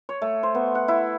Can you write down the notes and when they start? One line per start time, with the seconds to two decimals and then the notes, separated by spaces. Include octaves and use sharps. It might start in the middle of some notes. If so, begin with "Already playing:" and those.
0.09 C#5
0.22 A3
0.43 C5
0.55 B3
0.75 F#5
0.88 E4